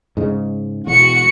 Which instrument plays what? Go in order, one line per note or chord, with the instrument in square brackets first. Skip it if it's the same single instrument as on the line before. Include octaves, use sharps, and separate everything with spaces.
[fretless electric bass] G#2 C#3 G#3
[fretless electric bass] E1 E2 [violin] F#4 C#7